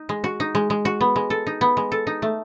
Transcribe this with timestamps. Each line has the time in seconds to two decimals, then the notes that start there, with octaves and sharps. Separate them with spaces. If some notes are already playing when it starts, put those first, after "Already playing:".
Already playing: D#4
0.09 G#3
0.24 F#4
0.40 D#4
0.55 G#3
0.70 G#3
0.85 F#4
1.01 B3
1.16 G#3
1.30 A4
1.47 D#4
1.61 B3
1.77 G#3
1.92 A4
2.07 D#4
2.22 A3